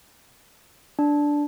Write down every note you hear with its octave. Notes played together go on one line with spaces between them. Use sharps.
D4